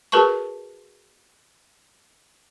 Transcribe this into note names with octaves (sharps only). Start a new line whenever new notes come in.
F#4 G#4 A#4 B4 A5 C#6